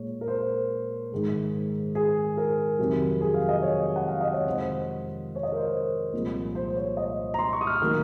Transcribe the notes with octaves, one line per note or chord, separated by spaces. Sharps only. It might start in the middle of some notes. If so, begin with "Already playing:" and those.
Already playing: A#2 G#3 C#5
A#4
C5
G#2 D#3 G#3
G#4
A#4
F2 C3 D#3 F#3
G#4
F5
D#5
C#5
F#5
F5
D#5
C#5
F2 C3 D#3 G#3 C5
C#5
D#5
A#4
C5
C2 A#2 F3 G#3
C5
C5
C#5
D#5
A#5
C6
C#6
D#6
F6
D#3 F#3 A#3